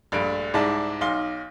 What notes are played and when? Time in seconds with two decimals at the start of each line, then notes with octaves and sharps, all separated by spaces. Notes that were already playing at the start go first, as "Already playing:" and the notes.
0.12 A#1 G2 A3 D7
0.54 C2 G#2 G#3 E4 D5 A5
1.01 B1 D#4 F5 C6 D6 G7